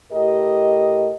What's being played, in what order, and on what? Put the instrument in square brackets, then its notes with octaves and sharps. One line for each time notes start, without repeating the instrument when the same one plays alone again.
[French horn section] A2 G4 A#4 D#5